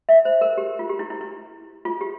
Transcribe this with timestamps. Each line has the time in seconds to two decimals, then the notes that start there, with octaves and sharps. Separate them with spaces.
0.09 E5
0.25 C5
0.41 A#4
0.57 G4
0.79 F4
0.89 G4
0.99 E4
1.10 E4
1.21 E4
1.85 F4
2.01 G4